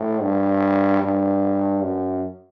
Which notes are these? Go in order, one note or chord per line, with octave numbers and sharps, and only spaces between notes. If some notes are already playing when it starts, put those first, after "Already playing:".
Already playing: A2
G2
G2
F#2